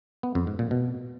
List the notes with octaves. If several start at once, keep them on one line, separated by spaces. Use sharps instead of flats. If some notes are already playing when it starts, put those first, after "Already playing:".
B3
F2
G#2
A#2
B2